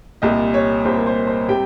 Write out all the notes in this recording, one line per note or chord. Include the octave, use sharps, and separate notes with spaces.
C2 A#2 G3 D#5
C#5
C2 A#2 G3 C5
A#4
C5
C5
C3 G3 G5